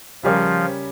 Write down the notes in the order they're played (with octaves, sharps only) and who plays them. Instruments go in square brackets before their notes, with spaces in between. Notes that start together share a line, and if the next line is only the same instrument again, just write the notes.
[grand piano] C#3 G3 C#4 G4 A#4 [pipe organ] F3